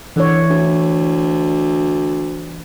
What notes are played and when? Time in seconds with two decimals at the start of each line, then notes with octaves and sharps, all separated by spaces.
0.16 D3 E3 C#5
0.50 D2